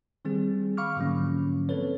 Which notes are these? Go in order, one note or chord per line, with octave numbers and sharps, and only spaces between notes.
D#3 G3 C4 G#4
F5 B5 C#6 D6 F6
G#2 D3 F3 F#3 A#3 C#4
C4 A4 B4 C#5